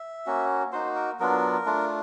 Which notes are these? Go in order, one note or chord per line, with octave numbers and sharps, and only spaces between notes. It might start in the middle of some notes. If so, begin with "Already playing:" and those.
Already playing: E5
A#3 C#4 F#4
A#3 D#4 F#4 C5
A#4
F#3 B3 D4 F4 A#4
A3 D4 F4